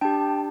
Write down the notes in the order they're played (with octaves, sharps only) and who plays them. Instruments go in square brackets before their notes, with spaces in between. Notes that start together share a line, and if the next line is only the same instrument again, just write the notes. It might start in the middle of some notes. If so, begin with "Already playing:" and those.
[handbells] D4 G4 G5 A5